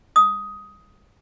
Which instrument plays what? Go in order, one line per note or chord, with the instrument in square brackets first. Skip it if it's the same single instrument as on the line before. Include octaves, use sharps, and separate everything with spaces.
[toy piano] D#6